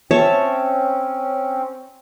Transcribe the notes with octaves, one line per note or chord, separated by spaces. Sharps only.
C4 C#4 C#5 E5 A5